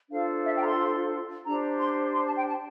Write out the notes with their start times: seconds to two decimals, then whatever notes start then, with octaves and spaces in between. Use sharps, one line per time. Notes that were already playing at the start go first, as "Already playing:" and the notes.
0.09 D4 F4 A4 C5 F5
0.43 E5
0.55 G5
0.61 A#5
0.66 C6
1.44 D4 G4 C5 A#5
1.78 C6
2.12 C6
2.24 A5
2.35 G5
2.46 A5